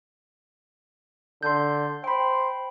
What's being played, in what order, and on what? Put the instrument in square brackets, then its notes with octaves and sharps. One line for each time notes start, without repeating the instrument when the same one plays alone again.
[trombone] D3 [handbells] C6 G6
[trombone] C5 [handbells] G5 B5